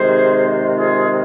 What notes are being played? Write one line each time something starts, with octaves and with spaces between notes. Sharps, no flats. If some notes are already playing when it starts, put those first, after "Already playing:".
Already playing: C3 D#3 G#3 G#4 C5
F4 G#4